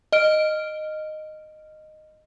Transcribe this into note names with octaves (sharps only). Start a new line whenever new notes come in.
D#5 F6 D7